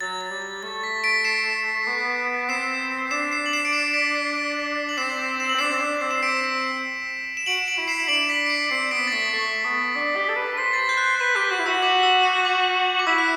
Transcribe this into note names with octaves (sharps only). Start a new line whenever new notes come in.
F#3 A6
A6
G3
A6
A3 A6
B6
B6 D7
C7 E7
B3
C4 C7 E7
D4 C7 E7
C7 E7
F#7
C7 E7
D7
C7 E7
B6 D7
B6
C7
B6 D7
F#7
C4 C7 E7
E7
F#7
C4
D4 C7 E7
C4
D4
C4
E7
C4 B6 D7
E7
F#4 D7 F#7
D7 F#7
E4
C7 E7
E7
D4 D7 F#7
B6 D7
D7
C7
C4 C7
B3 B6 D7
A6
A3 B6
A3
B3
D4
G4
A4
B4
C5 B6
A6
G6
F#6
G6
B4 B6
G4 G6
F#4 F#6
E4
F#4 E6
D6
E6
F#6
D6
D6
E4 E6
F#6